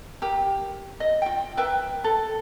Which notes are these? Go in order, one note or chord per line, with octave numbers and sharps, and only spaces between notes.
G4 A#4
D#5
F4 G5
A#4 B4 E5 G5
A4